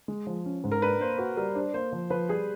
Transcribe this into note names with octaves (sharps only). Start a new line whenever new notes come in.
G#3
F3
C#4
G#2
A#4
D4 B4
A#3 C5
F#4 B4
G3 A#4
D4 C5
A#3 C5
F3
F3 B4
G3 G#4